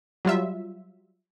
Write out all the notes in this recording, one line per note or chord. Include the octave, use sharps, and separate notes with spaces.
F#3 G3 F4 E5